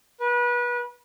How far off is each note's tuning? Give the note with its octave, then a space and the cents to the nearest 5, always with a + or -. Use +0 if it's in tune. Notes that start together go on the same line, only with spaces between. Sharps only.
B4 -30